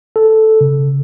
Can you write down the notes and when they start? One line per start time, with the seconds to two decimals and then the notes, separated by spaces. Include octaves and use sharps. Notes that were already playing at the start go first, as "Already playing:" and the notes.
0.16 A4
0.61 C#3